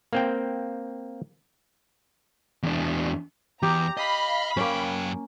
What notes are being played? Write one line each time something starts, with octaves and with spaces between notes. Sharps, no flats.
A#3 C4 G5
E2 D4
E2 G4 A#5
D#5 F5 B5
F#2 A#3 C#4 G5